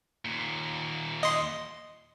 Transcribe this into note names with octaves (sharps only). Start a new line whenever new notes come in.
D#2 A#2
D#5 C6